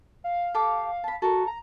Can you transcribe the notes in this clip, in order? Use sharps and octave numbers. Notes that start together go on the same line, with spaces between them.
F5
G4 A4 F5 D6
A5 B5
F#4 A4 A#4
A#5